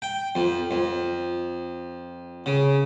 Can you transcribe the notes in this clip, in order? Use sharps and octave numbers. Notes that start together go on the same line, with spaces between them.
G5
F2
F2
C#3